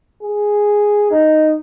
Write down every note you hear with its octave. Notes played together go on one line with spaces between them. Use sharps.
G#4
D#4